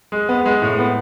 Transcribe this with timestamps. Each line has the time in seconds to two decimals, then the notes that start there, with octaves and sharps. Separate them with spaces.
0.12 G#3
0.29 B3
0.46 G#3
0.62 A2
0.78 B3